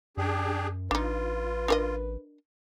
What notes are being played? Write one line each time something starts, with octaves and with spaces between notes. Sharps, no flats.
F#2 D4 G4 G#4
A1 D4 D#4 F4 B4
D4 A#4 D#5